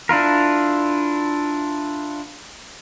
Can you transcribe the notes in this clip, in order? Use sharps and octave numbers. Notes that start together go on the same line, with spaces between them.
D4 E4 F4 A#4